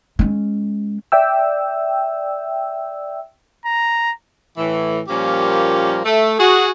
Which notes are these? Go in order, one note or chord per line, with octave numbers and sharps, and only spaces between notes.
G#3 C#4
D5 E5 G5 E6
A#5
A2 E3
A#2 F3 G3 A#3 C#4 G4
A3
F#4 G#4